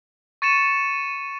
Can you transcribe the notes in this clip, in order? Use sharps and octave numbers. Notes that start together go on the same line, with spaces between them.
C#6 A6 C#7 D#7 E7